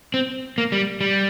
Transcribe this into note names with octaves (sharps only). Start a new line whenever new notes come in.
C4
A#3
G3
G3